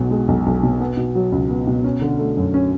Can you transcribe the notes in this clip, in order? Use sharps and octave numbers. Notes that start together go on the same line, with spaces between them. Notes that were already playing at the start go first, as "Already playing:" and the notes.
Already playing: B1 B2 F#3
G#3
B1
B1
B2
B3
B2
F#3
C#2
B3
B2
C#4
D3
A3
F#2
C#4